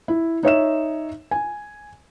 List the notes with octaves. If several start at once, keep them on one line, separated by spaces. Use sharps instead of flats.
E4
D#4 C#5 E5 E7
G#5